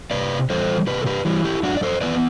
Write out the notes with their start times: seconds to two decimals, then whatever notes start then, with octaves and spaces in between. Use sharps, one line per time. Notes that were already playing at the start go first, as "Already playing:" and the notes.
0.11 C3 B4 D5
0.50 E3 G3 A4 C5
0.87 C3 G4 B4
1.02 A4
1.06 G4 B4
1.25 E3 G3
1.45 E4 G4
1.63 F#2 D4 F#4
1.77 D5
1.83 A4 C5
2.01 E3 B3 B4 D5